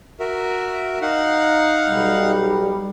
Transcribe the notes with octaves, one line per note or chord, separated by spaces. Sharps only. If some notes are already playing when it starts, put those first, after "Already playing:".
F#4 A#4 E5
D#4 F5 F#5
B1 G3